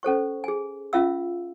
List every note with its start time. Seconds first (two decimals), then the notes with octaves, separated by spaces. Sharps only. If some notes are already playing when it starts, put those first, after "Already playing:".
0.03 C#4 A4 C5 C#6
0.44 G#4 G#5
0.93 C#4 F4 E5 F5 E6